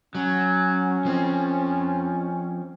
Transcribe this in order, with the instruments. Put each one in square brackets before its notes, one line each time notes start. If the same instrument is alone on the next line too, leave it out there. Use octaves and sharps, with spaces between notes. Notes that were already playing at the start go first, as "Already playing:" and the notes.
[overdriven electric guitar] F#3 [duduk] C#4
[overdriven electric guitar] F3 C4